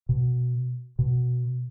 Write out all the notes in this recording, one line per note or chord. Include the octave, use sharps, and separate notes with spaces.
B2
B2